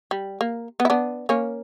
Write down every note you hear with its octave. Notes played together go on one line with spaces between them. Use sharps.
G3
A#3
B3
E4
B3 D4
A#3 C#4